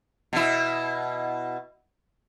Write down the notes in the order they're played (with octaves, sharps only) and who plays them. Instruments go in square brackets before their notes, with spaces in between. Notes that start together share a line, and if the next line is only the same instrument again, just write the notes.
[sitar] B2 E4